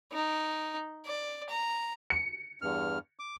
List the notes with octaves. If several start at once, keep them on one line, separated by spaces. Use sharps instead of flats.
D#4
D5
A#5
C#7
E2 G2 F6
D6